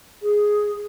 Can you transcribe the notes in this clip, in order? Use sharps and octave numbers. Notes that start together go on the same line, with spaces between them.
G#4